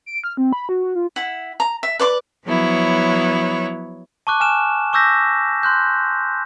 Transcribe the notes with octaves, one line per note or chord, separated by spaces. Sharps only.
D7
F6
C4
B5
F#4
F#4
F4
E4 F#5
A#5
E5
B4 D5 C6 D6
F3 F#3 B3 E4 C#5
A5 C#6 D6 F#6
G#5 F6 E7
C#6 D6 E6 G6 A#6 B6
C6 F#6 G6